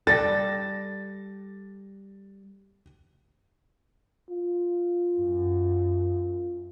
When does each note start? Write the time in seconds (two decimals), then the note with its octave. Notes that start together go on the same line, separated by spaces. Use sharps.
0.07 G3 A4 A6 A#6
4.29 F4
5.15 F#2